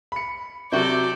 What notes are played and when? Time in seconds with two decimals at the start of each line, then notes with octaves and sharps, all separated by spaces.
0.12 B5 C#7
0.72 C3 F#3 F#4 A4 D5 E5 G6